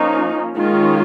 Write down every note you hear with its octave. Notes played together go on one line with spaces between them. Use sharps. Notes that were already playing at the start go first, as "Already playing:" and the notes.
Already playing: F3 A#3 C#4 D#4
D#3 G#3 C#4 F4